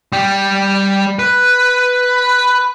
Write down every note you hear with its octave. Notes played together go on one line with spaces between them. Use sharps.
G3
B4